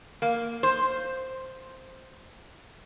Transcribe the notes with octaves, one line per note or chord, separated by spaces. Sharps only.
A#3
C5